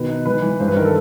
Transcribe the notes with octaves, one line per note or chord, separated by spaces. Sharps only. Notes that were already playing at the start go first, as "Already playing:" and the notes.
Already playing: B2 D#3 B4
D#4
E3 B4
E3
G2 C5
B4
D#3 A#4
A4